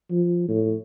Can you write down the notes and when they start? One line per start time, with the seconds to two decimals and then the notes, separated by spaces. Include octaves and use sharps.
0.11 F3
0.48 A2